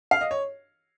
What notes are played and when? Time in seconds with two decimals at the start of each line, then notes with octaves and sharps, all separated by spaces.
0.11 F5
0.21 D#5
0.31 C#5